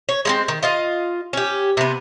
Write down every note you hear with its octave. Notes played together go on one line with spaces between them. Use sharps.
C#5
G#3 A#3 C4
D#3
F4 D#5 F5
C#4 G4
C3 B3